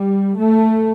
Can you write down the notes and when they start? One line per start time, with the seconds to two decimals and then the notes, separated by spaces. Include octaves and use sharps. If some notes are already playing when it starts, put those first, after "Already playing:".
Already playing: G3
0.38 A3